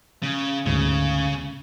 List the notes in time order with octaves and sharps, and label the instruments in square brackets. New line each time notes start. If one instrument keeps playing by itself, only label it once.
[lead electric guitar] C#3
[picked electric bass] D2 G#2 [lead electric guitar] C#3